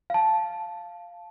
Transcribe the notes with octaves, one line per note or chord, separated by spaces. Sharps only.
F5 A5